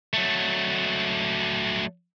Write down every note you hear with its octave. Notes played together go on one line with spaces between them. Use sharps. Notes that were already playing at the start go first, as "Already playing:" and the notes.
F#3 A3